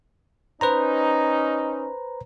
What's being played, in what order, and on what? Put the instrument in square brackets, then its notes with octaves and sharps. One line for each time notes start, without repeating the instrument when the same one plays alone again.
[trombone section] C#4 D#4 [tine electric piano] B4 C5 A#5